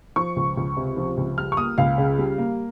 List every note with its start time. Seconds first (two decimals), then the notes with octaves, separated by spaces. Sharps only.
0.16 F3 C#6
0.36 C#2
0.57 C#2
0.77 C3
0.97 F3
1.17 C#2
1.38 G3 F6
1.52 C#6
1.57 A#3 D#6
1.78 C#2 F5
1.98 C#3
2.18 G3
2.38 A#3